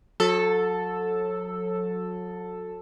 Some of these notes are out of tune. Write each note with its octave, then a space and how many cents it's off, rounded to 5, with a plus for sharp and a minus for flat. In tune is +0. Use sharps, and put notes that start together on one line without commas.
F#3 -35 A4 +0